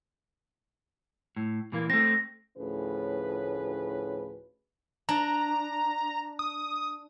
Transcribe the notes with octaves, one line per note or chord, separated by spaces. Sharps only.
A2
A#2 E3 A#3
A3 C4 A#6
D2 A2 F3 C#4 G#4 B4
D4 A#5
D#6